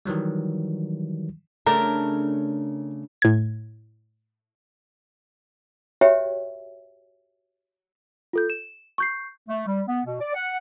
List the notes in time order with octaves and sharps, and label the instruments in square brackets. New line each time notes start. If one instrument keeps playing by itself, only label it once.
[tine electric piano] D#3 E3 F#3 G3
[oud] C#3 A3 D4 [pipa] A#4
[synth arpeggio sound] A2 G#6
[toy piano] F#4 G4 B4 C#5 E5 G5
[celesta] F4 A4 G6
E7
C#6 G6 C7
[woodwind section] A3
G3
B3
B2
D5
F#5